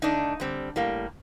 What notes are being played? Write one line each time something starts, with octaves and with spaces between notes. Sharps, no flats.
D3 A3 D4 D#4
D3 G3 C4
A2 G3 A#3